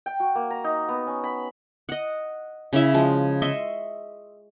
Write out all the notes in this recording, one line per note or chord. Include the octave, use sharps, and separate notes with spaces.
G5
F#4
A#3
A#5
D#4
B3
C#4
B5
D#5 F#5
C#3 C#4 E4 E5
F3 G#3
D#5 E5 C6 C#6